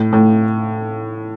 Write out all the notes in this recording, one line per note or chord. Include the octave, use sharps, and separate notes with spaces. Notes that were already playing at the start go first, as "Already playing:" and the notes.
Already playing: A2
A2